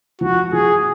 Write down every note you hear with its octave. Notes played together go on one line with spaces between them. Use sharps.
F3 F#4
F3 G#4